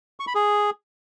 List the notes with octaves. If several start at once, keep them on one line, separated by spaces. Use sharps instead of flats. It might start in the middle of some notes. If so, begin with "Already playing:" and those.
C#6
B5
G#4